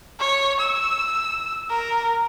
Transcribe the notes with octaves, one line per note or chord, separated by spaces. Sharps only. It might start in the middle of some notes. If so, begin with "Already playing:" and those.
C#5
E6
A#4